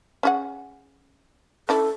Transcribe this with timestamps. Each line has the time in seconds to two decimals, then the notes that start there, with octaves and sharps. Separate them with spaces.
0.23 C#4 G#4 F#5
1.69 C#4 D4 E4 A4